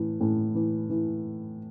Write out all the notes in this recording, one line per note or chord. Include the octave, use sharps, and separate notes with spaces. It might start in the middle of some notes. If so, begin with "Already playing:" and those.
Already playing: A2 E3
A2
E3
E3